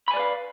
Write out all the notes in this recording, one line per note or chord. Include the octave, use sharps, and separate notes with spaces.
B4 D5 F5 G#5 B5